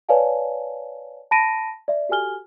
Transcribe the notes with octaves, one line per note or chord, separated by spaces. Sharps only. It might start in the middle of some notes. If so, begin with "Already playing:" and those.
B4 C#5 D5 F5 G#5 A5
A5 B5 A#6 D7 D#7
D5 E5
F#4 G4 A4 G#5 F6 G7